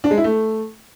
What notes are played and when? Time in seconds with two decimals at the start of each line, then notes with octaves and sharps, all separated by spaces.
0.04 D4
0.11 G#3
0.17 E4
0.24 A3